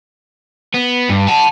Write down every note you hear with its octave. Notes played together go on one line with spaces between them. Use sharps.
B3
G2
F#5 A5